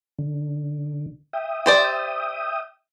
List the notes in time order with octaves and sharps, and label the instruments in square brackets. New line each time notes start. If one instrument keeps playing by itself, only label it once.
[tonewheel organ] D3
E5 G5 D#6
[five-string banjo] G4 C5 D5